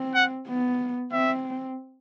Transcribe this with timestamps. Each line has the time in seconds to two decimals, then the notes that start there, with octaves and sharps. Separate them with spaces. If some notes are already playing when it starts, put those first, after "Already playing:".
Already playing: C4
0.15 F#5
0.48 B3
1.12 C4 E5